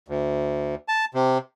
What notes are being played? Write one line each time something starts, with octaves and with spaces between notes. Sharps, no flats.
D2
A5
C3